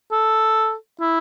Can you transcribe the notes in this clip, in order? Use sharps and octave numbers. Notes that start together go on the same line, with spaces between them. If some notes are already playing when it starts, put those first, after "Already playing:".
A4
E4